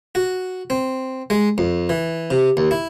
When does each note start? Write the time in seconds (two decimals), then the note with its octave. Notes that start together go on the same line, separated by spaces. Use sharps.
0.15 F#4
0.70 C4
1.30 G#3
1.58 F2
1.89 E3
2.30 C3
2.57 D#2
2.71 E4